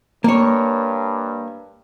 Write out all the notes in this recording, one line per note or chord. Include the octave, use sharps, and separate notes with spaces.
G2 A#3 C#5